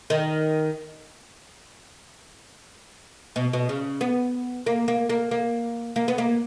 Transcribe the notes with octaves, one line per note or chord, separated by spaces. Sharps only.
D#3
B2
B2
C#3
B3
A#3
A#3
A#3
A#3
A#3
B3
A#3